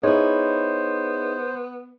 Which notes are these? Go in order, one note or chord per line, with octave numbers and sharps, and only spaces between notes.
B3 D#4 E4 G#4 C5 C#5